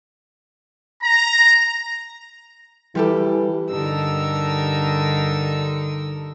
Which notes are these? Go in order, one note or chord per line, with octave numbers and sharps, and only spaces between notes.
A#5
E3 G3 F4 G4 A4
G2 D3 D#4 A#4 E6